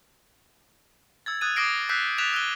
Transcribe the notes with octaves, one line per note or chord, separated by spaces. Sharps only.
E6 G#6 A6
D#6 F#6 G#6 A6 D#7
D6 D#6 F6 A#6 C7 D7
E6 F#6 G6 B6 C7
F#6 A6 B6 E7 F7
E6 F#6 D#7 G7